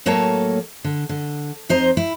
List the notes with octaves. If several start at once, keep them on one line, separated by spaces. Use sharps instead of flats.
A2 F#3 A#3 A4 C#5 A5
D3
D3
F2 D#4 C5 D#5 A#5
E4